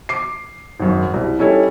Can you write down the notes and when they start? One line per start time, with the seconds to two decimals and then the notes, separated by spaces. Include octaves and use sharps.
0.09 D6 C7
0.80 G#1 F#2
1.14 C2
1.39 G3 C#4 D#4 E4 A4 C#5